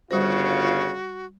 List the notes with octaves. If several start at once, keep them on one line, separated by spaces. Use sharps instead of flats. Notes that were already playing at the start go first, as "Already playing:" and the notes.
G1 C#3 G3 F4 F#4 C5